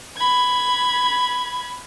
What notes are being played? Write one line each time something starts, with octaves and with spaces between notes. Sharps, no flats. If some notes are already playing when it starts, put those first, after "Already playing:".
B5 G#6